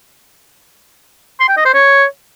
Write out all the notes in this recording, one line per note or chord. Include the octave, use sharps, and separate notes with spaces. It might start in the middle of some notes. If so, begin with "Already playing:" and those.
C6
G5
D#5
C5
C#5